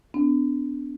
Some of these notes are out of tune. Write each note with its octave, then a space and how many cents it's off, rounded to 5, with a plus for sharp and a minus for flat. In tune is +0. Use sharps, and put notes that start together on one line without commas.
B3 +40 D4 -5